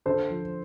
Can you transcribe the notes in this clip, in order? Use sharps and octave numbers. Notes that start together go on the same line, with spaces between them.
D3 A4 C5
F3